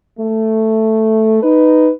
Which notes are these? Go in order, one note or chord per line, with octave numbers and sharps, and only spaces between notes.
A3
D#4 B4